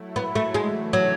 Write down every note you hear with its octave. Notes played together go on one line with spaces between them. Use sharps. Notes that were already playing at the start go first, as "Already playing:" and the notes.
Already playing: F#3 A3 E4
B3
A3
C#3 E3 G#3 A3 D4 F#4
F#3